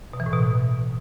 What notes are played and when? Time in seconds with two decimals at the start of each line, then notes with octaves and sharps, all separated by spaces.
0.13 B2
0.20 E3
0.26 A2
0.33 B2
0.39 A2